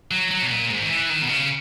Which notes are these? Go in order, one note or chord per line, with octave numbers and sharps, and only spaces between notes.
F#3
F#3
B2
A#2
G#2
D#3
E3
D#3
B2
C#3